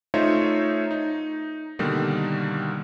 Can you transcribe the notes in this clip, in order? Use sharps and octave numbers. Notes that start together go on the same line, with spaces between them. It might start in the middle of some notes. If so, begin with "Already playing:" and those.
A3 D#4 F4 C5 C#5 E5
D#4
B2 D3 D#3 G3 A#3